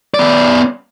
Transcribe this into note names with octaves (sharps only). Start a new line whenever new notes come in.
B3 D5